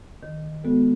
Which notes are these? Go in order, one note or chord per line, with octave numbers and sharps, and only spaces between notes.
D#3
G#3 B3 F#4 A4